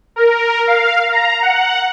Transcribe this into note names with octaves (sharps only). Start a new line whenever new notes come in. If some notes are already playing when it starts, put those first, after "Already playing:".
A#4
F5
A#5
F#5